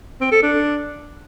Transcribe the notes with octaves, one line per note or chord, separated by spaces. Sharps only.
C4
A4
D4